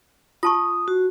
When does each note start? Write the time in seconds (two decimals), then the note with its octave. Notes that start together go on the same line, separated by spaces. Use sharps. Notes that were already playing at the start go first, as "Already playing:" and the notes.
0.43 F4 A5 C#6 D#6
0.88 F#4